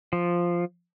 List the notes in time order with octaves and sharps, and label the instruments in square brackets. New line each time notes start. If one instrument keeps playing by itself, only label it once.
[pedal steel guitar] F3